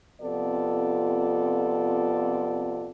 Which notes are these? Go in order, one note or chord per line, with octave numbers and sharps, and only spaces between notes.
F2 C3 B3 F4 A4 D5